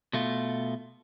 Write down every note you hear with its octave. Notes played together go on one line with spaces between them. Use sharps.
B2 A3 F4